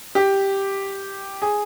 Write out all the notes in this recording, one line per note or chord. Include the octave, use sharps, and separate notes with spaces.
G4
G#4